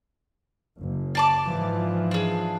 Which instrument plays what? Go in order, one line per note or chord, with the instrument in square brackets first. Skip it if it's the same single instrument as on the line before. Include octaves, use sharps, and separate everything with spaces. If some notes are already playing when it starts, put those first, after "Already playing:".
[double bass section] F#1
[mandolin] D5 A5 D6
[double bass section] G#2 E3 F3
[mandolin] D4 G#4